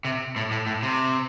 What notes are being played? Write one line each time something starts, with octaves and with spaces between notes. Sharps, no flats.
C3
A2
A2
A2
C3